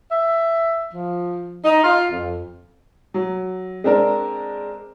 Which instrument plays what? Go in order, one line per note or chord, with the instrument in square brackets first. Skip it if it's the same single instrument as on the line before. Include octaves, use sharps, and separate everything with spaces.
[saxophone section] E5
F3
D#4
F4
F2
[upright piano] F#3
G#3 C4 D4 A#4